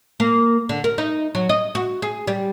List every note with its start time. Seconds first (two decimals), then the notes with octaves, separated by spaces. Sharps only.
0.20 A#3
0.69 D3
0.84 A#4
0.98 D#4
1.35 F#3
1.49 D#5
1.75 F#4
2.02 G#4
2.27 G3